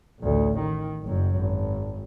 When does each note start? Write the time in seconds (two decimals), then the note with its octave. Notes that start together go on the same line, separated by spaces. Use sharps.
0.20 A1 D2
0.59 D#3
1.03 F#1 F#2
1.36 G#1